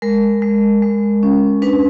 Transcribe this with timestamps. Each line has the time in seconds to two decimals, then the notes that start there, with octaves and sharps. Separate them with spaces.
0.02 G#3 A#4
0.42 G#3
0.82 G#3
1.23 C#4
1.62 D4 B4